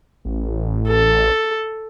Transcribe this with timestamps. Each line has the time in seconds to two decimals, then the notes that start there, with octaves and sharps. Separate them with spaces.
0.25 A1
0.88 A4